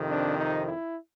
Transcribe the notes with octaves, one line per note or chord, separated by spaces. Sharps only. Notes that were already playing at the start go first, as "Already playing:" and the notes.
Already playing: F2 C3 D#3
D4
D#4
E4